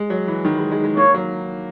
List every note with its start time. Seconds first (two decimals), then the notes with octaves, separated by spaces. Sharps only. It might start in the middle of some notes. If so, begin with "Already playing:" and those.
Already playing: G#3
0.10 F#3
0.27 E3
0.45 D#3
0.58 G#3
0.71 G#3
0.84 G#3
0.97 A#3 C#5
1.14 F#3